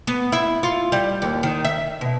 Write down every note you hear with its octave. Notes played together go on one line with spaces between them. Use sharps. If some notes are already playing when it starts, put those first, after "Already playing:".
B3
E4
F4
G3
D#2
D#3
E5
B2